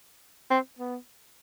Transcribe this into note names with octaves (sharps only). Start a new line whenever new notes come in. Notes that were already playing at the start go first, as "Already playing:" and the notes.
C4
B3